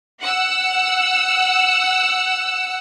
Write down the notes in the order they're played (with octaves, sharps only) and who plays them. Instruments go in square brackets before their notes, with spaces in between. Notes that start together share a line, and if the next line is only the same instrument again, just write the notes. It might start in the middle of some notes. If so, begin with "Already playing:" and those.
[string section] F#5 E6